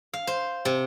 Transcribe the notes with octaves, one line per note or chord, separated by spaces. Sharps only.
F5
C5
C3